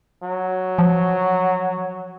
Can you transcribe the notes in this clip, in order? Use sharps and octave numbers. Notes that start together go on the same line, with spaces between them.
F#3
F3